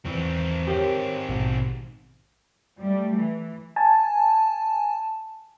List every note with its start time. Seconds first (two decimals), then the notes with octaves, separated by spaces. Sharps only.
0.05 E2 D#3 E3 C4
0.67 G4 A#4 C#5
1.29 A#1 G#2 B2
2.80 G3 A3
3.15 E3
3.76 G#5 A5